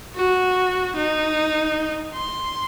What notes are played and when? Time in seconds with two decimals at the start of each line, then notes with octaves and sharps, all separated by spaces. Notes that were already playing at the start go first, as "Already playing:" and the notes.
0.15 F#4
0.96 D#4
2.14 C6